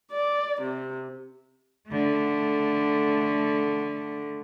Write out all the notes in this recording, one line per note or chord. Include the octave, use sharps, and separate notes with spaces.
D5
C3
D3 A3